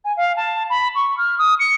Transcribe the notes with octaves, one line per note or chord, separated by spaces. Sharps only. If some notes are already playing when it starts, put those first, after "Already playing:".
G#5
F5
A5
B5
C#6
F6
D#6
C#7